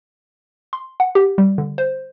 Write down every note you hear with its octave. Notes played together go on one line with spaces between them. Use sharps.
C6
F#5
G4
G3
D3
C5